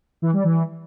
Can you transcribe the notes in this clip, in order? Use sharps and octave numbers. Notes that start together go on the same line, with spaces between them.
E3
G3
E3